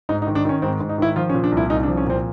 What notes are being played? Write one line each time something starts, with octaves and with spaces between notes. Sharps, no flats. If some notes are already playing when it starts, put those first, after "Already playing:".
G#2 D#4
D#4
D#3
D4
D#3 C#4
G#2 C4
G#2
D#4
D#3 E4
F3 F4
C#4
A#2
D4
C2
E4
C2 D#4
D4
F3
C#4
A#2 C4